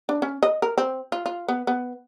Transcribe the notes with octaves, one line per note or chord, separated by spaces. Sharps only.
D4
C#4
D#5
A#4
C4
F4
F4
B3
B3